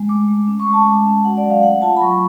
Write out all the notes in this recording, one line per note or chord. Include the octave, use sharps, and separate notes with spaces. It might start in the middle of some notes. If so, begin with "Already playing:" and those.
Already playing: G#3
A3 D6
A3
C#4 D6
C#6
G#3
A5
G#3
C#4
F#4 F#5
D5
F#3
F5
A3 F#5
F4 A5
B5
F#3 C#6